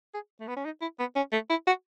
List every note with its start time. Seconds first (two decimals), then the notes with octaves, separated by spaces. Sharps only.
0.14 G#4
0.40 A3
0.48 B3
0.56 C#4
0.65 D#4
0.81 E4
0.99 B3
1.15 C#4
1.32 A3
1.50 E4
1.67 F#4